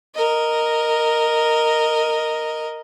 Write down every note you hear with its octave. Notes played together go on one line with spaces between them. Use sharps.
A#4 D#5